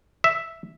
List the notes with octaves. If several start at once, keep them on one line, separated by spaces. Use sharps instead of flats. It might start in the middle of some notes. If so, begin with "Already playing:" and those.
E5